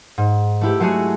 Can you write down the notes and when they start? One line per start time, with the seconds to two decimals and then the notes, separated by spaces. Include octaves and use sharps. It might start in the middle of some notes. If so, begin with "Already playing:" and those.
0.18 G#2
0.61 A3 E4 G4
0.80 F#3 G#3 A3 F#4 G#4